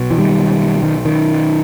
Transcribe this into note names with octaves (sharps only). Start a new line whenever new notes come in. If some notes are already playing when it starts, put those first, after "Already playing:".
Already playing: B1 B2
E3
D#3 G3
D#3
D#3